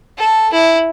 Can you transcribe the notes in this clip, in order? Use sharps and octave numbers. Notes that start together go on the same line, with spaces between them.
A4
E4